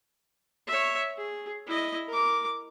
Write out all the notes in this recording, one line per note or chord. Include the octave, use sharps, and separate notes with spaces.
C#5 E5
G#4
E4 D#5
A#4 D6